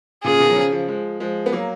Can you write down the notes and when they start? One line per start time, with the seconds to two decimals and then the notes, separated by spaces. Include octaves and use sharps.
0.24 A#2 C#3 G#4
0.40 B2 D#3
0.50 F#3
0.56 C#3 F3
0.72 C#3 F3
0.88 F3 G#3
1.20 F3 G#3
1.46 B3
1.52 F#3 A#3